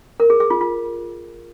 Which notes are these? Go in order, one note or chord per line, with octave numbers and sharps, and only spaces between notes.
A#4
G#4
G#4
F4
F4